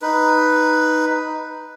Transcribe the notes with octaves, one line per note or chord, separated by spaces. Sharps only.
D#4 B4